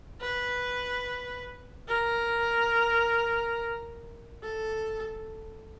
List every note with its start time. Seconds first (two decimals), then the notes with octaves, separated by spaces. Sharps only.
0.21 B4
1.89 A#4
4.42 A4